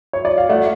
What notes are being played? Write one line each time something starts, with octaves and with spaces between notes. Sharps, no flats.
C#5
D5
F5
A3 D5 F#5